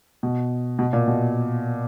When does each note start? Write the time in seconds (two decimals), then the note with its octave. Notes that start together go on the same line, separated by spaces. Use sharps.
0.23 B2
0.79 B2
0.93 A#2
1.08 B2